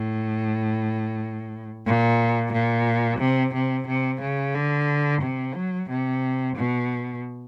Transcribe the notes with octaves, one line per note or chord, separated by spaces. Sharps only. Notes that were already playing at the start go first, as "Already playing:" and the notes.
Already playing: A2
A#2
A#2
C3
C3
C3
C#3
D3
C3
F#3
C3
B2